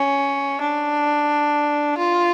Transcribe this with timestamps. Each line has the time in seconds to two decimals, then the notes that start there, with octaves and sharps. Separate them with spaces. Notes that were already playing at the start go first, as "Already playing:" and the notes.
Already playing: C#4
0.61 D4
1.98 F4